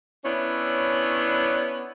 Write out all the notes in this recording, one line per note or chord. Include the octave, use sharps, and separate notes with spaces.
B3 C#4 D4 E4 C#5